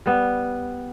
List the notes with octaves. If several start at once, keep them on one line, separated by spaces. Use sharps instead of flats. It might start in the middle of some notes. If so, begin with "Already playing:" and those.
G3 B3